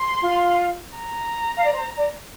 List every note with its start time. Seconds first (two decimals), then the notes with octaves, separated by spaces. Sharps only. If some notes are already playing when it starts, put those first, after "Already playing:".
Already playing: C6
0.22 F4
0.98 A#5
1.56 F5
1.64 D5
1.73 C5
1.97 D5